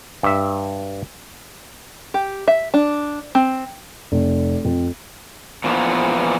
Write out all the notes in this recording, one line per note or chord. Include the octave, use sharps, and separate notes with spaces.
G2 E5
G4
E5
D4
C4
F1
F2
A#2 E3 F3 A#3 B3